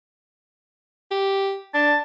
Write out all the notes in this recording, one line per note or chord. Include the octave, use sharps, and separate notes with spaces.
G4
D4 A5